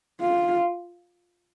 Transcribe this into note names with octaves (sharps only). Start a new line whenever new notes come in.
F4